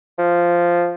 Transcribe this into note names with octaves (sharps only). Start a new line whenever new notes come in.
F3